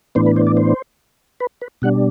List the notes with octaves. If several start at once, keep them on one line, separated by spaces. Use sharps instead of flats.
A2 E3 B3 D4 C5
B4
C5
D5
C5
B4
B4
B2 G3 D4 F#5